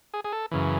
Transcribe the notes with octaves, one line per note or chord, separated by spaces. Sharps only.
G#4
G#4
A4
F#2 C#3 E3